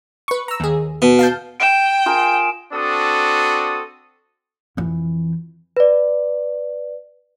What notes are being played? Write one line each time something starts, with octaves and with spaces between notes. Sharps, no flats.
B4 C#6
A#5 E6
D#2 G#4
B2
F5 A5 G6
G5 D7 E7
F4 G#4 A#4
C4 D4 F#4 A4 D#6
F2 E3
B4 D5